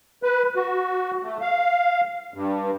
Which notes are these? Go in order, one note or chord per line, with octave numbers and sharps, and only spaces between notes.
B4
F#4
A3
F5
G2